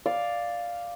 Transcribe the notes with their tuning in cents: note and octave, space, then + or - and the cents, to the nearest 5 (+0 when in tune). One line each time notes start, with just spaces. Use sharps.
D5 +0 F5 +0